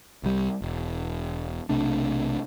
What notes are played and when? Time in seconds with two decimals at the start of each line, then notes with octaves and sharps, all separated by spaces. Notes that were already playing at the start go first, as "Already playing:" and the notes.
0.23 C2 G3
0.62 E1
1.69 B1 C3 A3 D4